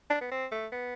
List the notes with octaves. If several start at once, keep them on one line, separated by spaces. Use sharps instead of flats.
D4
B3
C4
A3
B3